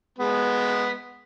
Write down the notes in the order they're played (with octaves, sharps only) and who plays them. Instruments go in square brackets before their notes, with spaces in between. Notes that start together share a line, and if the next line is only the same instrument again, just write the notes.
[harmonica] G#3 B3